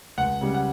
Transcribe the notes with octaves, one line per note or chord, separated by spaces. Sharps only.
C#2 F#5
C#3 G3
F#5